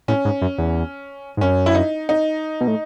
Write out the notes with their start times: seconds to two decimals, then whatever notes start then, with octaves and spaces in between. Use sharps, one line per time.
0.08 A2 C#4
0.25 G#2
0.42 F#2
0.58 E2
1.37 G#2
1.41 F#2 C#4
1.66 E4
1.75 D#4
2.09 D#4
2.60 B2
2.68 A2